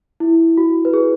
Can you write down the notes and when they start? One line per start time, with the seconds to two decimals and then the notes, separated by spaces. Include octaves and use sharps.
0.20 E4
0.57 F#4
0.85 B4
0.94 G#4